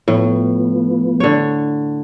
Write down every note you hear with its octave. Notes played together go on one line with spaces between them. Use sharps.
A2 F3 B3
D3 C#5